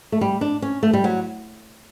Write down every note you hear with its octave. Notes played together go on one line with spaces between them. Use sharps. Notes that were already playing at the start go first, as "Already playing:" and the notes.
A3
G3
D4
C#4
A3
G3
F#3